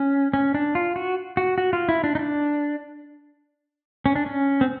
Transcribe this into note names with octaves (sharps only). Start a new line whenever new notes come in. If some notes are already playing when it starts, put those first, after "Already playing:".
Already playing: C#4
C#4
D4
F4
F#4
F#4
F#4
F4
E4
D4
D#4
D4
C#4
D4
C#4
C4